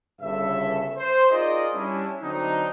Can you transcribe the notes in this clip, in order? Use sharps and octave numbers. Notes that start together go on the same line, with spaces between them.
G1 G2 C#3 A4 E5
C5
D#4 F4 G#4 A#4 D5 D#5
G3 C#4 D4 E4
D3 F#3 C4 D4 D#4